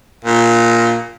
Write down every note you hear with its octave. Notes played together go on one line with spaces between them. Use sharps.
A#2